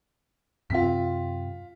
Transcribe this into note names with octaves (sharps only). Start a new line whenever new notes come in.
F#2 C3 C4 F4 B6